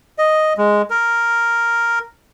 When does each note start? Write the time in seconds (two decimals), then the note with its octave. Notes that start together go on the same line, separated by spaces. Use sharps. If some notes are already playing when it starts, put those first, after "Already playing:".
0.18 D#5
0.58 G#3
0.90 A#4